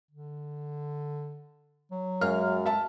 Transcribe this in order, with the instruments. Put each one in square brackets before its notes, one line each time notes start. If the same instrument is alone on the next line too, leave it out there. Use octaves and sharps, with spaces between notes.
[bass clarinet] D3
F#3
[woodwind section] F#2 [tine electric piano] G#3 F5 [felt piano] F6
[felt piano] E5 A5